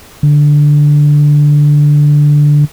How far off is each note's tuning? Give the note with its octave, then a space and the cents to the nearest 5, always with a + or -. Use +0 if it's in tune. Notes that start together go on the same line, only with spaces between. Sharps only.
D3 +0